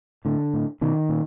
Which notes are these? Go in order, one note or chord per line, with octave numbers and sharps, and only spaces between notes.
A2 D3
A2
B2 D#3
A#2